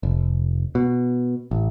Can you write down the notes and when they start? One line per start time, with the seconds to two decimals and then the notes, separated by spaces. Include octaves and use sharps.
0.03 F1
0.75 B2
1.51 A1